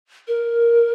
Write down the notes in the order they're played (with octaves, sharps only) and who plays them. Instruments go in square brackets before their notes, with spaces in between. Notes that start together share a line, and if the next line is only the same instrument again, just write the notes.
[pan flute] A#4